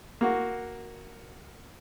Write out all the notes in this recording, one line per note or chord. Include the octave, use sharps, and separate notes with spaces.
A#3 F#4